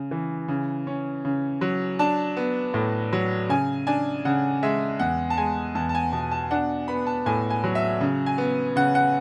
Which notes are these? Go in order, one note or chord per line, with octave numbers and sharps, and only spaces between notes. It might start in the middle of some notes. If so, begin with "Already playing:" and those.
Already playing: C#3
E3
C#3
C#4
C#3
F#3
D4 A5
B3
A2
F#3
C#3 G#5
D4 G#5
C#3 F#5
G#3 E5
E2 F#5
A5
G#3 G#5
E2 A5
A5
G#5
B2 A5
A5
D4 F#5
B3 B5
A5
A2 G#5
G#5
F#3
E5
C#3
G#5
B3
C#3 F#5
F#5